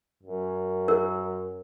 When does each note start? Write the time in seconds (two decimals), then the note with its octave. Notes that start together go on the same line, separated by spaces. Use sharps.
0.23 F#2
0.88 A#4